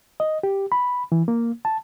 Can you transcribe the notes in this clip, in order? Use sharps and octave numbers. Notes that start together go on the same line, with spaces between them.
D#5
G4
B5
E3
A#3
A5